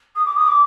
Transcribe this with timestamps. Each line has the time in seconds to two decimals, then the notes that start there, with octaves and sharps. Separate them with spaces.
0.16 D#6
0.26 D6
0.36 D#6
0.48 D6